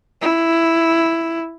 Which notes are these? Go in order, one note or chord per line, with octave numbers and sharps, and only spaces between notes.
E4